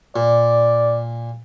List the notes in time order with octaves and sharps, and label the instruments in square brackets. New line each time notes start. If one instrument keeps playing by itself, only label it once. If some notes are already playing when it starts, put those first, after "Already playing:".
[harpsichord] A#2 [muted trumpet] D5